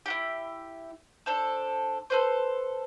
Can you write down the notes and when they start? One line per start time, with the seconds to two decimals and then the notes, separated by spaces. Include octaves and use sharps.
0.06 E4 F#4 G4
1.26 D4 A4 C5
2.10 A4 B4 C5